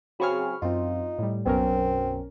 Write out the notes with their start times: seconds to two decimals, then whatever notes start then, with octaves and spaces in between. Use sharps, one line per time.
0.20 C#3 F#3 C4 G#4 B5 C#6 F6
0.62 F#2 C4 D#4 F4
1.18 A2 G3
1.46 B1 F#2 B2 C4 C#4 A#4